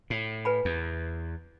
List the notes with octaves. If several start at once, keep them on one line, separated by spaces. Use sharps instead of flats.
A2
B4 G#5 B5
E2